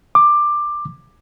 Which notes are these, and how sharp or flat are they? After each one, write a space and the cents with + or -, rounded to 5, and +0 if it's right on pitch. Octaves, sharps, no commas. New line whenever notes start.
D6 +15